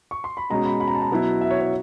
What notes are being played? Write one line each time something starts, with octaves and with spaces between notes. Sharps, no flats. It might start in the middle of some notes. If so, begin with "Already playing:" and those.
C#6
C6
B5
B2 G#3 C#4 A#5
B5
B5
A#5
A5
A#5
B2 F#3 B3 E4
E5
C#5
C#5